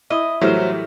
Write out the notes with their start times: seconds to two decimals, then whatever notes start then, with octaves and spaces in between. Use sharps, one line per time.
0.10 E4 D#5
0.41 A2 E3 F#3 G3 A3 A#4 C5